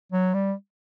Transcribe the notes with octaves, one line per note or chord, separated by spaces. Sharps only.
F#3
G3